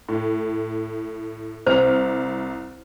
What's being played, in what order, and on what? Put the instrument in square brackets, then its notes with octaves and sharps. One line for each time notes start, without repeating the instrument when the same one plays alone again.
[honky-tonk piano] A2
[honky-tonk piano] C2 F6 [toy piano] C5